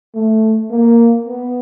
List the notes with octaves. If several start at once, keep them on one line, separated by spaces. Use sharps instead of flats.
A3
A#3
B3